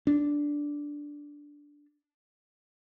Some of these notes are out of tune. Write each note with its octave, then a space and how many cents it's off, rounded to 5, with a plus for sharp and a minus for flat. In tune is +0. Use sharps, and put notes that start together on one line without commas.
D4 -5